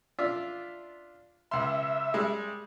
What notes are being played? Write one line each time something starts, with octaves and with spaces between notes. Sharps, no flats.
D4 F4 E5
C#2 E5 C6
G3 G#3